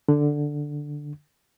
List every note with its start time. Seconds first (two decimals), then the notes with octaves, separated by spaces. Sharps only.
0.08 D3